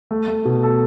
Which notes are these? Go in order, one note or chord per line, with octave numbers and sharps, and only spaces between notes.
A3
A3
B2
A4